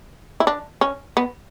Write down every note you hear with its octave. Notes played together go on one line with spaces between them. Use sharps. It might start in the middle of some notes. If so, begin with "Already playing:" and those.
E4
D4
C#4
B3